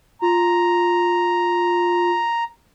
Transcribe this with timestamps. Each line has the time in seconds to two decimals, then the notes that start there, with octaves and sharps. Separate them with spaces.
0.22 F4 A#5